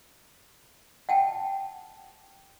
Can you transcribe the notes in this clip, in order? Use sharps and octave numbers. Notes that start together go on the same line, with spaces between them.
F#5 G5 A5